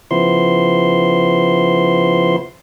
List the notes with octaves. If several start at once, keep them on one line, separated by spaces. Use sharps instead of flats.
C#3 F3 B3 E4 C5 C6